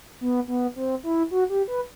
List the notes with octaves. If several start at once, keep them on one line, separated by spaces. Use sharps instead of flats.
B3
B3
C4
E4
F#4
G4
B4